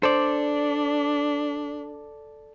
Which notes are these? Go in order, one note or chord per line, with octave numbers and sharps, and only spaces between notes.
D4 A4 C5 D5